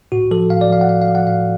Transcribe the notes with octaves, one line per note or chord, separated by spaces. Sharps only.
A2 F#4
F3 A4
A2 F5
D5
F3 F5
F#5
A2 F5
F5
F3
F#5
A2 F5